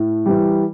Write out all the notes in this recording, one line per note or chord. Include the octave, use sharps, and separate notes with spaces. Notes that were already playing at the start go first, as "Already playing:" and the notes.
Already playing: A2
E3 G3